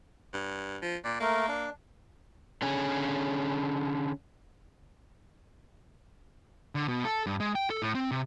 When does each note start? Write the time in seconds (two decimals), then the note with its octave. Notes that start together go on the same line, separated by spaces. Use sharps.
0.33 G2
0.82 F3
1.04 A#2 D5
1.20 A3 A#3 A#4
1.48 D4
2.62 D3 C#4 G#4
6.75 D3
6.88 B2
7.05 A4
7.27 G2
7.40 G#3
7.55 G5
7.70 A4
7.82 A2
7.95 C4
8.11 C3